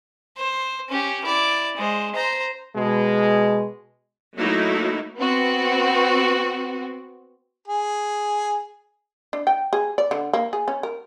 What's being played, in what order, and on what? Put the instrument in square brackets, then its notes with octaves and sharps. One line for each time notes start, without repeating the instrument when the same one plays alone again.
[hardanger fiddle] C5
C#4 G4
E4 D5
G#3 C5
C5 A#5
[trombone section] B2 G#3
[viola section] F#3 A3 A#3 D#4 E4 F#4
[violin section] B3 C4 F#4
[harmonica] G#4
[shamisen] D4
G5
G#4
D5
D3
A#3
G#4
C#4
A#4